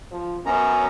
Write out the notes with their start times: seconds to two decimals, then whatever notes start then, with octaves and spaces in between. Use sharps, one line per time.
0.12 F3
0.46 F#2 B3 C#4 A#5